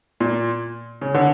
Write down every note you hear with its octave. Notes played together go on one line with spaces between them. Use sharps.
A#2
C#3
D3